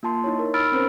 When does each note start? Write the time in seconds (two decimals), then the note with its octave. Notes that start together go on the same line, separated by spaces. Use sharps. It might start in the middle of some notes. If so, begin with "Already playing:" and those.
0.03 A#3 F4 A5 C6
0.24 D#4 E4 C#5
0.39 A#4
0.54 A#4 B5 E6 F6 A6 D7
0.72 C4 C#4 A#4 C5